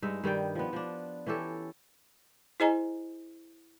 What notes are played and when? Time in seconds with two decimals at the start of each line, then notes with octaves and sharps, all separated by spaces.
0.02 G2 G#3 D#4 E5
0.24 G2 D#3 G3 G5
0.55 F3 B3
0.73 F3 D4
1.26 E3 C#4 G4 A4
2.60 E4 G#4 C5 D#5 G#5 A#5